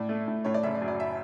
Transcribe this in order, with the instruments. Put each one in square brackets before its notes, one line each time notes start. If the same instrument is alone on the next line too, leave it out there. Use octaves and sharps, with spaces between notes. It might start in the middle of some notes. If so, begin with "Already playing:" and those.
Already playing: [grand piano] A2 [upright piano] D5
[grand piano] A3
A2
[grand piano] A2 [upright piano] C#5
[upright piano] D5
[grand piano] F#1 [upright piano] E5
[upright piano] D5
[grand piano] F#2
[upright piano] D5
E5